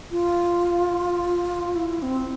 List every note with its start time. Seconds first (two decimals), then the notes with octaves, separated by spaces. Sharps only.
0.12 F4
1.75 E4
2.02 C4